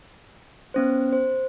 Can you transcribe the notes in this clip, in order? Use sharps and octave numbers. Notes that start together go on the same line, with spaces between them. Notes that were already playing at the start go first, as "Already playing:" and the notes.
B3 C#4 C5
C5